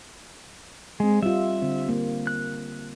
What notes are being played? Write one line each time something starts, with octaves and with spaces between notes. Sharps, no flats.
G#3 C4 D#5
G3 F4 E5
D3 C4
A#3
F#6